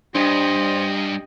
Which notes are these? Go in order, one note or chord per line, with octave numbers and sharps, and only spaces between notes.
G2 D4 G4 C5 D#5